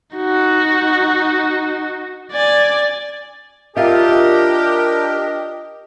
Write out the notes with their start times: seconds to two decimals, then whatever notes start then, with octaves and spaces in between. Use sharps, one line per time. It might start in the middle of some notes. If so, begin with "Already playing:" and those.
0.16 D#4 F#4
2.32 D5 G#5
3.77 D4 F4 G4 A#4 D#5 E5